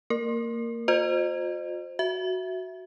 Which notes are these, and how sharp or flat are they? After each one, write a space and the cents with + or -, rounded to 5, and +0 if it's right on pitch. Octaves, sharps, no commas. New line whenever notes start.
A#3 -20 A#4 +0
F4 +40 C5 +0 D#5 -35
F#4 +0 E5 +0